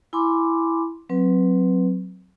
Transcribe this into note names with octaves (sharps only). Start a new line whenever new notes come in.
E4 G#5 B5 C6 D6
F#3 C4 B4